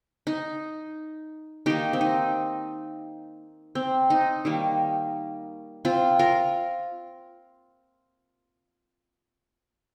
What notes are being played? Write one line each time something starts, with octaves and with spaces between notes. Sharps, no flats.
D#4
D#3 A#3 D#4 G4
C4
D#4
C4
D#4
D#3 G3 A#3
C4 F4
F4 A#4